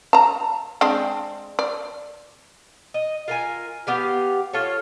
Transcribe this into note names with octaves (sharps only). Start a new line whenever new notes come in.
A5 A#5
G#3 C4 D4
D5
D#5
F4 A#4 G#5
B3 G4 F5
F4 A4 C#5